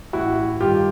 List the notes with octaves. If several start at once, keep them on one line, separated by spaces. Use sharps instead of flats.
A1 E4 F#4
G2 D#3 F4 G4